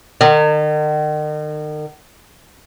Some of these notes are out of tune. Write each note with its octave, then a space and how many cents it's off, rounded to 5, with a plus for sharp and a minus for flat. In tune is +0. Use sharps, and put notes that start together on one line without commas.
D#3 -40